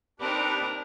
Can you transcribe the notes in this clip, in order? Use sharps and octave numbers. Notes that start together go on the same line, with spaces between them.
C4 D4 D#4 G4 A#4 B4